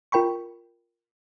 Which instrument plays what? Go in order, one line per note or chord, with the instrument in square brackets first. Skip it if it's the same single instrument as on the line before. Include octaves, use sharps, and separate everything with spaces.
[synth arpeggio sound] F4 A#4 G5 B5 C#6